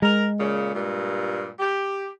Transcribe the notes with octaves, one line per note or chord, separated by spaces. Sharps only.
G#3 A#4
A#2 C#3
G2 A#2
G4